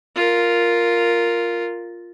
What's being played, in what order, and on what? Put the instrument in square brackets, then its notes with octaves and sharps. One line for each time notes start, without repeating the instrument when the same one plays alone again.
[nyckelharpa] F4 A#4